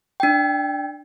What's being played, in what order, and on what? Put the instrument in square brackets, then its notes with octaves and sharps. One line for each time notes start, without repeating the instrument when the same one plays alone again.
[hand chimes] D4 G5